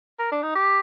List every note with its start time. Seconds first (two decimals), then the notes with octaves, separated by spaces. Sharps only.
0.19 A#4
0.32 D4
0.43 D#4
0.55 G4